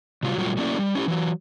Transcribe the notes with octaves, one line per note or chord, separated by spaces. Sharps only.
C3 F#3 G3 F4
A#2 F#3 G3 A3 F4 F#4
F#3 A3 A#3 C#4 E4 D5
G3
C#4 E4 G4
E3 F#3